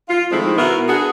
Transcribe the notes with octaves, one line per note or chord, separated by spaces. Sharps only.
F4
D#3 F3 G#3 A3 C4 E4
B2 B3 E4 F#4 A#4
B3 D4 F#4 G#4